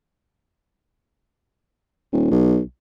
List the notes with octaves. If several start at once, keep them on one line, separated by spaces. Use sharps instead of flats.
D#1
B1